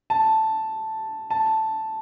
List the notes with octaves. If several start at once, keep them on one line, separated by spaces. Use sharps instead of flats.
A5
A5